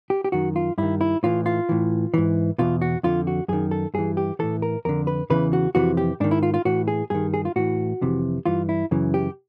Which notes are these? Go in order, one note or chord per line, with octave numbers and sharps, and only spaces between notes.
G4
G4
F#2 D#3 F#4
F4
G2 D#3 E4
E4
A2 E3 F4
F4
A2 E3
G#2 E3
E2 B2 F4
F#4
F2 D3 F4
F#4
F#2 D#3 G#4
A4
G2 E3 G#4
G4
A2 E3 A4
A#4
F2 D3 A#4
B4
E2 C#3 E3 B4
F#4
F2 C3 E3 F#4
G4
G#2 D#3 D4
E4
F4
F4
A2 E3 F#4
G#4
G2 D#3 G#4
G#4
F4
A2 E3 F#4
F2 C3 E3
G2 E3 F4
E4
F#2 C#3 E3
G4